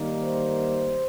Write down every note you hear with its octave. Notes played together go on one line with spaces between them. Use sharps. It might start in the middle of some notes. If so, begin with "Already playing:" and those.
Already playing: D#3 G3 A#3 D#4
C5